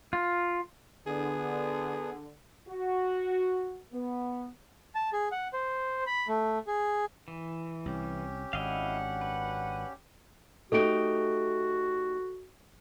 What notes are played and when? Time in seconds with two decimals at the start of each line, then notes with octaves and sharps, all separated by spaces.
0.13 F4
1.07 D3 B3 G#4
2.68 F#4
3.93 B3
4.95 A5
5.13 G#4
5.32 F#5
5.53 C5
6.07 B5
6.28 A3
6.67 G#4
7.28 E3
7.86 C2 C#4 G4
8.53 G#1 F#2 D4 E4 D#5 F5 F#5
9.21 B4
10.72 A3 D#4 F#4 G4 A4 D7